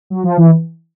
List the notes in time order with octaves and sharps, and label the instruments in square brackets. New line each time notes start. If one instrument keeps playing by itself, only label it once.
[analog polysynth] F#3
F3
E3